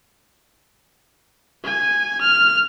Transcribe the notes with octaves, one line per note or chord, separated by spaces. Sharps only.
G#5
F6